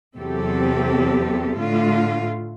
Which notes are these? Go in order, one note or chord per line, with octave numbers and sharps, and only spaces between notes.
E2 C3 F#3 C4 G4 A4
A2 D3 A3 F4